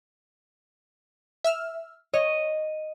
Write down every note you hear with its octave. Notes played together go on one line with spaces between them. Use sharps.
E5 E6 F6
C#5 D#5